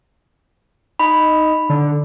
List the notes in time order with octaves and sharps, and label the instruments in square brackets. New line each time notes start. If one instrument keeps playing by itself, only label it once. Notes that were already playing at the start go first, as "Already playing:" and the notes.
[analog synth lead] D#4 [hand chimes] B5
[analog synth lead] D3